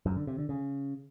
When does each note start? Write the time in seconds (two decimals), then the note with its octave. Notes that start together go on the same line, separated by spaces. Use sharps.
0.06 F#2
0.16 D3
0.27 C3
0.38 D3
0.49 C#3